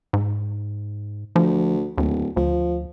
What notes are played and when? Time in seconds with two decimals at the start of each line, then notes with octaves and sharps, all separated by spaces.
0.13 G#2
1.36 D2 F3
1.98 D1 D#2
2.37 D2 F3